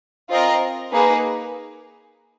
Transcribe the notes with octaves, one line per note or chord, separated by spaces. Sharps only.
C4 F4 A#4 D#5
A#3 D#4 G#4 B4